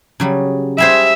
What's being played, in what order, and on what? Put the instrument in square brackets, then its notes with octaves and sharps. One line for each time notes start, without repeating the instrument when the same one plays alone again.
[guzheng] C#3 F#3 G3
[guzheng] G3 G#4 C5 [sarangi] E5